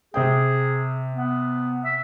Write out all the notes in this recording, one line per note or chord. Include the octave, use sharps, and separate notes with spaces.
C3 G#4 C5 G5
B3
E5